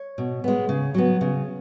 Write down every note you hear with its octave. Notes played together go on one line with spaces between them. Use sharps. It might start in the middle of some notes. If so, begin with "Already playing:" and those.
Already playing: C#5
B2
G#3 B3
C#3
F#3 B3
C#3